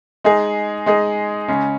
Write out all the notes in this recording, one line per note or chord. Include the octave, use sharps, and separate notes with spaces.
G#3 D#4 G#4
G#3 D#4 G#4
C#3 G#3 C#4